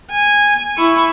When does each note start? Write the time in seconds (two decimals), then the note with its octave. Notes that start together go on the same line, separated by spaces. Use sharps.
0.11 G#5
0.77 E4 C#6